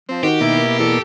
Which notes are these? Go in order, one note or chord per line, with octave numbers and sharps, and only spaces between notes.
F3 C4
D#3 F#4 G4
B2 A#3 E4
E2 A4